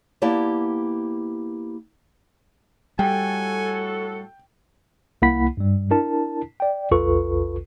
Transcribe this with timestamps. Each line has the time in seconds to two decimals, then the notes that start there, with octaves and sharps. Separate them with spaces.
0.22 A#3 B3 E4 G4 D5 A5
2.99 A2 G3 F#4 A4 G5 G#5
5.22 C2 A#3 E4 F#5 B5 B6
5.57 G2 G3
5.91 D4 E4 A#4 A5
6.60 D5 G5
6.91 A#1 E2 F4 A4 B4 C#6